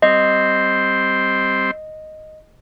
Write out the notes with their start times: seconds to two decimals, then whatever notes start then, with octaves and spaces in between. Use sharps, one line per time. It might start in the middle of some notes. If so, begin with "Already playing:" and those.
0.02 G3 C4 C5 D#5